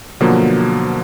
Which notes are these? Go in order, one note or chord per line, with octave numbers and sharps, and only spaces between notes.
B2 D3 F3 F#3 A#3